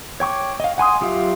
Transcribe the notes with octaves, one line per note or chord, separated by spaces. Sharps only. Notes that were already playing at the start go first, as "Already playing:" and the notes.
C#5 G5 C#6 D6
D#5 F5
F#5 G#5 C6 D#6
F#3 F4 G4 E5 F5